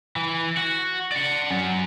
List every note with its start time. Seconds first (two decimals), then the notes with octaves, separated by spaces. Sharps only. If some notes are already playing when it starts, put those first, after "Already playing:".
0.16 E3
0.57 F#4
1.12 D5 F#5
1.51 F#3 C#4